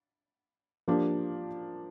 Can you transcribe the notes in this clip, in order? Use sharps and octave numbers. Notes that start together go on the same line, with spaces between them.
F3 A#3 D4 G4